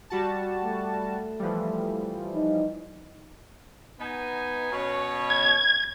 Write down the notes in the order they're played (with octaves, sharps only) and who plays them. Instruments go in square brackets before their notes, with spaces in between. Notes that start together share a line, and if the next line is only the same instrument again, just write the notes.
[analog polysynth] G3 F#4 A5
[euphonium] A3
[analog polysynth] E3 F3 G3
[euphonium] D#4
[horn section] B3 D#4 G#5
B2 C#4 C#5
[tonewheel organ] G#6